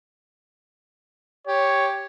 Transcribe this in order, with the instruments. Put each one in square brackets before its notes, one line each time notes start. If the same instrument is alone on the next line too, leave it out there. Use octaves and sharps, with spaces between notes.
[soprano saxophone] G4 [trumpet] C#5